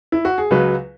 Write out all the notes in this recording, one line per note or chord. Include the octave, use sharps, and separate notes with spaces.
E4
F#4
G#4
C#2 C#3 F#3 B4